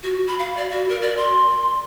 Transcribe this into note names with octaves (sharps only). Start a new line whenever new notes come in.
F#4
B5
F5
D5
F#4
A#4
D5
C6